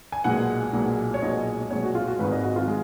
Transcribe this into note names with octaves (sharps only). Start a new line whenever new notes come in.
G#5
B1 A#2 G#3 F#5
B1 A#2 G#3
C#5
B1 A#2 G#3 D#5
B1 A#2 G#3 C#5
F#4
F4
F#4
G#1 G#2 D#3 G#3 B4
D#5
F#4
F4
G#3